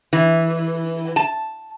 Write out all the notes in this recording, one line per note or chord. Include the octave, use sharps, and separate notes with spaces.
E3
A5